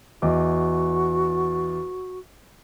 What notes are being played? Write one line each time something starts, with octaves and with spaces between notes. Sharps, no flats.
E2 F#4 D#5 D6